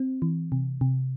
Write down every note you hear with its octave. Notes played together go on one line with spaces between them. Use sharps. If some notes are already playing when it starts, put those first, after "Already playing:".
Already playing: C4
E3
C3
C3